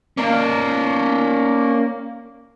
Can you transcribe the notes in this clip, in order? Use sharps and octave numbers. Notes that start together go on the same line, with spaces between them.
A#3 C#4 D5